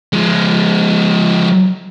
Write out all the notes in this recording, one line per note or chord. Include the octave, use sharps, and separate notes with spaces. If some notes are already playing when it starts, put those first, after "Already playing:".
F3 G#3